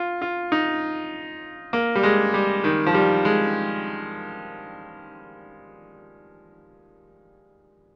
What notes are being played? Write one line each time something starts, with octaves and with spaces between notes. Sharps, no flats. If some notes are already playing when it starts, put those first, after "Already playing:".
Already playing: F4
F4
D#4
A#3
G3
G#3
G3
D#3
F3
G3
G#3